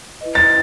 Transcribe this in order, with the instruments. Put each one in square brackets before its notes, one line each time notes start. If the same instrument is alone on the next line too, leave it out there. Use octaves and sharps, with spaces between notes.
[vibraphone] E4 B4 D#5
[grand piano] A6